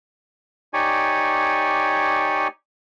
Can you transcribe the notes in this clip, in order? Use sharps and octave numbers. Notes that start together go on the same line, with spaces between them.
D#4 G4 C#5 D5 G#5